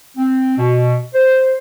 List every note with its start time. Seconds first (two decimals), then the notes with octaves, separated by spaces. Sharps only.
0.18 C4
0.58 B2
1.15 C5